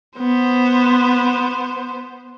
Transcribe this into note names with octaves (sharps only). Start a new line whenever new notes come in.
B3 C5